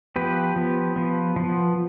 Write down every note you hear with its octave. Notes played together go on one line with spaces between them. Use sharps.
F3 B3 G4 B4
F3 B3
F3 B3
F3 B3